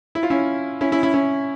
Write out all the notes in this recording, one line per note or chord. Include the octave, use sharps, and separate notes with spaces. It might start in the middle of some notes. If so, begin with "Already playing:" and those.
E4
F4
C#4 E4
C#4 E4
C#4 E4
C#4 E4
C#4 E4